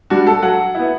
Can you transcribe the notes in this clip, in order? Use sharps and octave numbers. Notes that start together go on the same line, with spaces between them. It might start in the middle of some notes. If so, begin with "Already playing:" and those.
G3 D4 F#4
A4
F#3 F#5
B3 E4